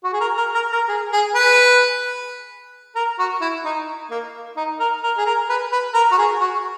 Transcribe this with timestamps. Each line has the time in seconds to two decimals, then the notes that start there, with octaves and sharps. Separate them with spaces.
0.04 F#4
0.13 G#4
0.20 A#4
0.38 A#4
0.55 A#4
0.72 A#4
0.88 G#4
1.12 G#4
1.35 B4
2.95 A#4
3.19 F#4
3.41 E4
3.65 D#4
4.11 A#3
4.57 D#4
4.80 A#4
5.03 A#4
5.17 G#4
5.26 A#4
5.49 B4
5.72 B4
5.94 A#4
6.11 F#4
6.18 G#4
6.40 F#4